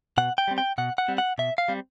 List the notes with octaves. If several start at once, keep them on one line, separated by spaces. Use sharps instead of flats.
B2 F#5
G5
G3 C4
G5
B2 F#5
F#5
G3 C4
F#5
B2 E5
F5
G3 C4